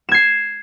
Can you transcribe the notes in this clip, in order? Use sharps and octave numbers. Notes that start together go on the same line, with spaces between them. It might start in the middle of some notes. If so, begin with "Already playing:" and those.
G#6 C7 E7